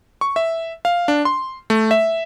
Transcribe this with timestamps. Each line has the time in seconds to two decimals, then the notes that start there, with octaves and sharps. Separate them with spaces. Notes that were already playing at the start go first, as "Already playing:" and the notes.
0.21 C#6
0.36 E5
0.85 F5
1.08 D4
1.25 C6
1.70 A3
1.91 E5